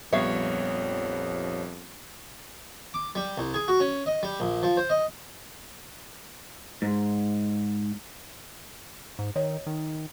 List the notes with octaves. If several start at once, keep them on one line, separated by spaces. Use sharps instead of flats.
A#1 F2 G3 B3 C#5 E5 F5
D6
G3
C2
G#4
F#4
C#4
D#5
G3
A#1
F3
C5
D#5
G#2
G#2
D#3 C#5 D#5
D#3